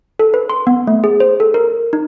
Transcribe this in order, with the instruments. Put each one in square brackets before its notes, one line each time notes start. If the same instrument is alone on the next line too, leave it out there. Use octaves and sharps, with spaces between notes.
[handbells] A4
B4
C6
B3
A3
G#4
C5
A4
A#4
D#4